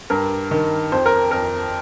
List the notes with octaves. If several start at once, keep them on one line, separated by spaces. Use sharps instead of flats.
G2 A#4
D#3
F2 C5
A#4
F2 A#4